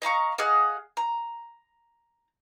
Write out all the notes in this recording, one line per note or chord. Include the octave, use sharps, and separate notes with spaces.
D#5 F5 A#5 C#6
G#4 D#5 F5 F#5
A#5